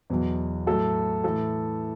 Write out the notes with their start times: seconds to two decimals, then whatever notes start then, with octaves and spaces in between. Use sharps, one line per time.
0.10 E2 B2 F#3
0.67 A2 F#3 A4
1.24 A2 E3 A4